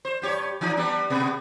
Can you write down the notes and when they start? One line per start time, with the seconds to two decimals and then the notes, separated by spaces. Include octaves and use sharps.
0.05 C5
0.22 G2 G4 C#5
0.61 E3 D#4
0.77 G3 B3 D4
1.10 B2 B3